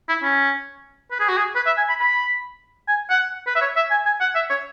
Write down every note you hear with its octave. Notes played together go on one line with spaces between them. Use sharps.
E4
C#4
B4
G#4
F#4
G#4
B4
E5
G#5
B5
B5
G#5
F#5
B4
E5
C#5
E5
G#5
G#5
F#5
E5
C#5